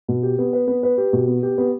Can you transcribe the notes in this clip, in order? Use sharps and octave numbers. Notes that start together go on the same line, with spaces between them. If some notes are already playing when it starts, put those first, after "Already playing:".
B2
G4
B3
B4
B3
B4
G4
B2
B3
G4
B3